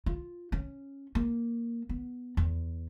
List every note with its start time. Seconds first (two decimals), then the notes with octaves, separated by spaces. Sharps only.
0.06 F4
0.52 C#4
1.15 A#3
1.89 B3
2.37 E2